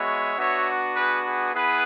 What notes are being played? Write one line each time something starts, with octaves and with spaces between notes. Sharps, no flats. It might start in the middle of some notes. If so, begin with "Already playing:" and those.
Already playing: G#3 B3 F#4 C#5 E5
B3 D4 F#4 C#5 E5
G#4 B4
G#4 B4
B3 E4 G#4 B4